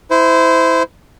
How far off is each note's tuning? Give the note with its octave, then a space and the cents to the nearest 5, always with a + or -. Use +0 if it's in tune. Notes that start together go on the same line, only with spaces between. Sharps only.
E4 -10 C5 -25